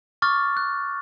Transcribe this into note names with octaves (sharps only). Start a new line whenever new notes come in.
C#6 D6 F6 A6
F#6